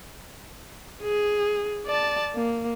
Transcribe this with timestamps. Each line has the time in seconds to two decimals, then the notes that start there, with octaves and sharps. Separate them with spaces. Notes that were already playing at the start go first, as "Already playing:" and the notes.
1.03 G#4
1.86 D5 A5
2.35 A#3